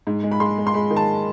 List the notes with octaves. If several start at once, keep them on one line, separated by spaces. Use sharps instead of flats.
G#2
G#3
B5
G#3 C6
G#3
C6
G#3 B5
D#3
A5